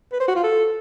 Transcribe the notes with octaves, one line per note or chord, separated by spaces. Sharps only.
B4
C5
F#4
F4
A4